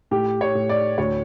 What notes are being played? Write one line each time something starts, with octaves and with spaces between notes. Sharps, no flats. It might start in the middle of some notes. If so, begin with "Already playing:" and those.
A2 G4
C#5
A2
D5
D2 C#5